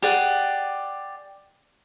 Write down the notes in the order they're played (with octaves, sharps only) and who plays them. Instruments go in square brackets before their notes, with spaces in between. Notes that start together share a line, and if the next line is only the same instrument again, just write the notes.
[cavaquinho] G4 G#4 D5 F#5